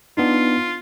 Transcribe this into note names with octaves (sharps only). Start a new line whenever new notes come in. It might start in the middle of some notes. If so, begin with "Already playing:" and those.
B3 D4 D#4 F4